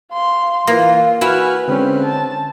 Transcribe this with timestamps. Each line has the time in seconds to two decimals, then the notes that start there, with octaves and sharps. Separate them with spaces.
0.12 F5 C6
0.67 E3 A#3 F4
1.21 E4 F#4 B4 G#5 F6
1.68 D3 G#3 C4 C#4
2.03 A5